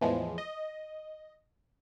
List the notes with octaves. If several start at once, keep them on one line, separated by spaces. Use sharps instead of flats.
E2 A2 E3 F3 G#3
D#5